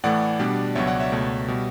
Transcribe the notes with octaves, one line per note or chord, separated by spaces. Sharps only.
A2 E3 A3 D5 F#5
B2 G3 D4
C#2 B2 F#3 C#5 E5
D5 F#5
C#5 E5
C#2 B2 A3
B2 G3